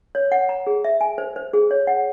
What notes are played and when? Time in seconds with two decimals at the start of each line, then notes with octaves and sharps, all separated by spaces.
0.15 C#5
0.32 F#5
0.49 A#5
0.67 G#4
0.84 E5
1.01 G#5
1.18 C5
1.36 C5
1.53 G#4
1.71 C#5
1.87 F#5